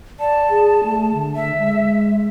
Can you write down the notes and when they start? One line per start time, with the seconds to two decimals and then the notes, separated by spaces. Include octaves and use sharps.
0.20 D5 A5
0.50 G#4
0.84 A3
1.14 D3
1.35 E5
1.59 G#3